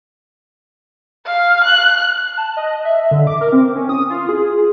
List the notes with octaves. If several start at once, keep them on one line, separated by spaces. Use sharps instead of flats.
F5
F#6
A5
D#5
E5
D3
D6
A#4
C4
C#4
D#6
F4
G#4